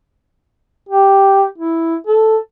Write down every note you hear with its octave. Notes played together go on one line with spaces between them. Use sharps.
G4
E4
A4